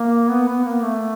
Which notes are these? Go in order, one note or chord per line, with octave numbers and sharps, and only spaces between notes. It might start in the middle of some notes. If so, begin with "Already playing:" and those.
Already playing: A#3
B3
B3
A#3
A3